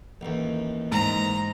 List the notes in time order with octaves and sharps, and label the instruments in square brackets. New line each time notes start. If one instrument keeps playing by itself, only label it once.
[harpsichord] A1 D#2
[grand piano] G#2 [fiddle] A#5